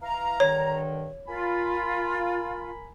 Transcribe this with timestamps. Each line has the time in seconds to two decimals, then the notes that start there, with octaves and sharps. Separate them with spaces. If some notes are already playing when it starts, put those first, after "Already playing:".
0.01 E3 F5 A#5
0.40 G2 D3 D#3 C#5
1.28 F4 A#4 G#5 B5